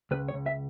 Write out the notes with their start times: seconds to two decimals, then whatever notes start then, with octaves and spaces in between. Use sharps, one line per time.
0.11 C#2 B4
0.28 C#5
0.34 C#2
0.46 E5